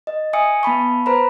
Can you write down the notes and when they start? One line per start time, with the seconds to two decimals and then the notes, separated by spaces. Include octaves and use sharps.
0.07 D#5
0.33 E5 G#5 D#6 C#7
0.63 B3 A5 B5 C#6
1.06 B4 C5 A#5 B5